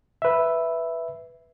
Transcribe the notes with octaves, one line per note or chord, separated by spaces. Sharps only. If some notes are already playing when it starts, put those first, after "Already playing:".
B4 E5